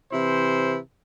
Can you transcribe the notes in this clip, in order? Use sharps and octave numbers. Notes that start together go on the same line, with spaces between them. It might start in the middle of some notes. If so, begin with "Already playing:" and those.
C3 E3 E4 C5